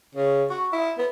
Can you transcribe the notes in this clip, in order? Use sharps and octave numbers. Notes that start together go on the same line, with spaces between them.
C#3
F#4
E4
B3